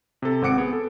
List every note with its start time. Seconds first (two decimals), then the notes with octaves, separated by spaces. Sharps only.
0.22 C3 A4
0.42 G#1 C4 F#5 D6 C#7 D7
0.58 B3 G#4
0.73 A4